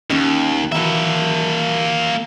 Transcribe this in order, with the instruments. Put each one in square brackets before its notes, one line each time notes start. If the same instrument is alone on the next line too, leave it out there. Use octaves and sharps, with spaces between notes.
[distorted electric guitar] D#2 [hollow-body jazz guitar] C#4
[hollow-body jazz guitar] D#3 E3 F#3 [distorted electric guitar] A#3 E5